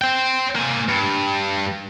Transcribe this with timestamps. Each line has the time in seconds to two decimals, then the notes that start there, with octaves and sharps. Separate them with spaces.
0.02 C5 G5
0.55 A#3 G#5
0.88 G2